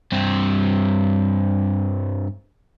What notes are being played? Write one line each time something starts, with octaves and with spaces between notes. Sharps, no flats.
G2 C4